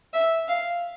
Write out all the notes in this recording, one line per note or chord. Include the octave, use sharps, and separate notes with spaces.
E5
F5